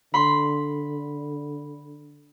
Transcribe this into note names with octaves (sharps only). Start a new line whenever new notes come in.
D3 B5 C6